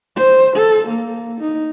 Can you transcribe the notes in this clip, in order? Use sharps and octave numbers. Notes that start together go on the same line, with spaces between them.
C5
A4
A#3
D#4